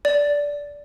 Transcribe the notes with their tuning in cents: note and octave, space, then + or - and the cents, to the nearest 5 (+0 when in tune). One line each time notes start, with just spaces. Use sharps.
D5 -15